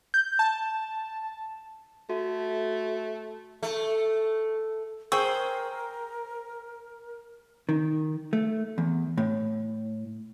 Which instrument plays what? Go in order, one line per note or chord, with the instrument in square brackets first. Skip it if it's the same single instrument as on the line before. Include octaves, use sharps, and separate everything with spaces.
[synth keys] G6
A5
[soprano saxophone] A3 [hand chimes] F#4
[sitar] A3
[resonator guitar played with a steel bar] G#4 C5 [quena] A#4 [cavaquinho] G5 [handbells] C#6 E6
[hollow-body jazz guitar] D#3
A3
E2
A2